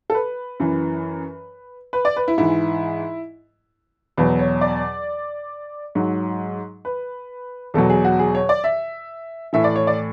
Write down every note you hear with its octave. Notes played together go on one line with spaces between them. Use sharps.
A4
B4
F#2 E3
B4
D5
B4
E4
G#2 E3 E4
E2 B2 F#3 B4
C#5
D5
G#2 F#3
B4
E2 B2 F#3 A4
G#4
F#4
G#4
C#5
D5
E5
A2 E3 E5
D5
C#5
D5